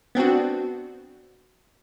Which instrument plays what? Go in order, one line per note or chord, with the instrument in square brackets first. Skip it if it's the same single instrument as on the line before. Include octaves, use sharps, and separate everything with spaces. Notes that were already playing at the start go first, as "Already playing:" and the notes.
[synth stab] B3 C4 D4 F#4